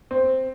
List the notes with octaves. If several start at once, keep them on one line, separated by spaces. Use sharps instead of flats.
C4